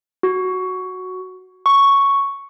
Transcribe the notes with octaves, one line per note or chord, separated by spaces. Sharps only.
F#4
C#6